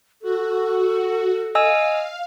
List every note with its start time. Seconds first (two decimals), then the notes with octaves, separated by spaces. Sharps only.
0.22 F#4 A4
1.55 D#5 F5 G#5 E6